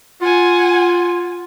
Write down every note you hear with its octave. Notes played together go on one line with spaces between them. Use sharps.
F4 F#5 G#5